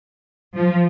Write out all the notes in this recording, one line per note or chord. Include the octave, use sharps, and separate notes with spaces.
F3